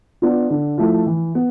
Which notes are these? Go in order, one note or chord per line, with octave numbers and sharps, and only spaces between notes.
B3 D4 F4
D3
F3 A3 E4
E3
B3